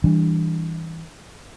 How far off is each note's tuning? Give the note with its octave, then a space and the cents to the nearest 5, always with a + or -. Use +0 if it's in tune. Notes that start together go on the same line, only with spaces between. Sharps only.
E3 -15 G3 +0 D4 +0